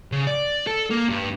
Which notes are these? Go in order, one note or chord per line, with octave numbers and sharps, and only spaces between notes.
C#3
D5
A4
A#3
G2